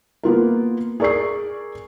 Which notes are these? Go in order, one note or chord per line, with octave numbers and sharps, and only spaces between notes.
A#3 B3 F4 A#4
G#4 A#4 D5 C#6 E6 C7